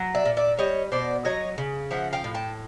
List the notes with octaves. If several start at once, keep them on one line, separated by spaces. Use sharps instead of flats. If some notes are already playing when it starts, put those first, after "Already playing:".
Already playing: F#3
D5 E5
A#2
D5 E5
G3 C#5 D#5
B2 C5 D5
F#3 C#5 D#5
C#3
F3 E5 F#5
F5 G5
A2
G5 A5